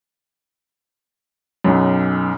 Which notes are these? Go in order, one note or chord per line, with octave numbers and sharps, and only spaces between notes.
B1 F#2